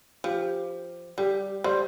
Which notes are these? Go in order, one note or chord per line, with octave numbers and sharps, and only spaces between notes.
F3 G4
G3 G4
G3 C5